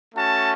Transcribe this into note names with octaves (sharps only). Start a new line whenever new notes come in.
A3 C#4 F#4 A5